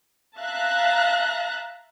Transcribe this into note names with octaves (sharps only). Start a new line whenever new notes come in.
E5 F5 A5 A#5 F#6